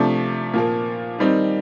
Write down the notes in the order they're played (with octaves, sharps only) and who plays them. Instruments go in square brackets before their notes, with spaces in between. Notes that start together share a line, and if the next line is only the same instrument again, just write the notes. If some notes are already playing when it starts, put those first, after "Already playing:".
Already playing: [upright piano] C3 F3 A3 D4
A#2 F3 A#3
D#3 G3 C4 D#4